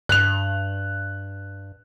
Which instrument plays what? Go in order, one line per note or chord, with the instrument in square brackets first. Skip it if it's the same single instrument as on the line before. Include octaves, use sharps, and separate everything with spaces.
[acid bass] G2 [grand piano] F#6 F7